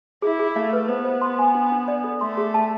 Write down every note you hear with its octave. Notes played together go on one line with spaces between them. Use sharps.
E4 G#4
G#4
A3 F5
B4
B3 C5
C5
C6
G#5
D4
D4
D5
A4
A3 C6
G#4
A5